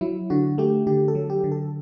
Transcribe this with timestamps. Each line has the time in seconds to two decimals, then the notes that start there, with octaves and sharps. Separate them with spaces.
0.01 F#3 E4
0.30 D3 F#4
0.58 A3 G4
0.87 D3 G4
1.08 A4
1.15 F#3
1.30 G4
1.44 D3
1.52 A4